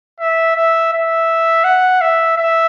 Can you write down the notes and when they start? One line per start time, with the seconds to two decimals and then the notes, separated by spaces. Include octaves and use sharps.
0.20 E5
0.56 E5
0.93 E5
1.64 F#5
2.01 E5
2.37 E5